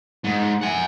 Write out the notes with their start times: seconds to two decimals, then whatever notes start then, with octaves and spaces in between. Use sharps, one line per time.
0.24 G#2
0.61 F#5 G#5